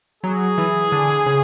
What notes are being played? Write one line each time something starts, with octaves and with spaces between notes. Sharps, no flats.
F#3 G#4
E3
D3
C#3